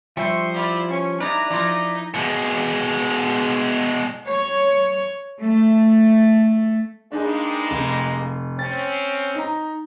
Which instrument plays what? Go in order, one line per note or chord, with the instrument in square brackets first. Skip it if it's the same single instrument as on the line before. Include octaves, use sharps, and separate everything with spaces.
[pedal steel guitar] F3 C5 [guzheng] G3 [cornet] E5 [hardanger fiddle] C#6
[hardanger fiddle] E4 F4 [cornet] D5
[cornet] C#4 [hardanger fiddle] C#6
[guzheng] D#4 D#5 [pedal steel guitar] E4 B4 [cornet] D5 [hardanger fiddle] A#5
[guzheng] F3 F4 [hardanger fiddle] D#4 [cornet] D5
[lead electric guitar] B2 G#3
[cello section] C#5
A3
[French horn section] G2 G#3 A#3 [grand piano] D4 D#4 G#4
[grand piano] F1
[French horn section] C4 C#4 [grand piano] A6
[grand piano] D#4 A#5